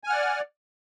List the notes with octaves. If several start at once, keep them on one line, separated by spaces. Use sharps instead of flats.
D5 F#5 G#5 F6